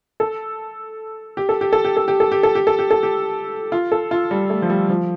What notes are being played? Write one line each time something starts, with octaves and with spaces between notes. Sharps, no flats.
A4
G4
A4
G4
A4
G4
A4
G4
A4
G4
A4
G4
A4
G4
A4
G4
F4
A4
F4
G3
A3
F3
G3
F3